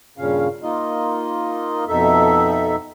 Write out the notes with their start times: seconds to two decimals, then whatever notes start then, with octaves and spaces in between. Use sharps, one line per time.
0.18 G2 A#2 C#3 C#4 F5
0.63 A#3 D#4 F4 D#5
1.88 F2 B2 D#4 A4 E5